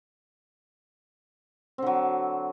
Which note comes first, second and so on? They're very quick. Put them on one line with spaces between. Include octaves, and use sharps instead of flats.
C4 D3 F#3